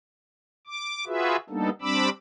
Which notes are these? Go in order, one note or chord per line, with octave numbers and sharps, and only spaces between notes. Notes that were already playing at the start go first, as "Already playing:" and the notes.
D6
F4 F#4 G#4 B4 E5
G3 A#3 B3 D4 D#4 A4
G3 C4 D4 B5 D6 E6